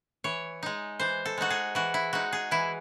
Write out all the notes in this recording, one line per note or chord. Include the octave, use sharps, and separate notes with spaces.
E3 C#5
G#3 D#4
E3 C5
A4
G#3 D#4 F#4
G#4
E3 F#4
E4
G#3 D#4 F#4
G#4
E3 E4